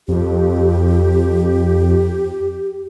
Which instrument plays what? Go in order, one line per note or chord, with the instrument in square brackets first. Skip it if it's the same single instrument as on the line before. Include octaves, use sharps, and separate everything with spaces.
[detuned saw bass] F2 [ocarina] G4